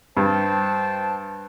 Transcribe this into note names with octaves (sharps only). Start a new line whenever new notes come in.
G2 C5 G5 A5